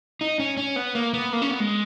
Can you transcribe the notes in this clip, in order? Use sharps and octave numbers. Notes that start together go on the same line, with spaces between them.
D#4
C#4
C#4
B3
A#3
B3
A#3
C#4
B3
G#3